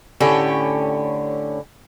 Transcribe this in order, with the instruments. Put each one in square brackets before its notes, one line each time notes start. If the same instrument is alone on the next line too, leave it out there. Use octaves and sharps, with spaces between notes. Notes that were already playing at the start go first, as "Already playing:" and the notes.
[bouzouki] A2 D3 C#4 G4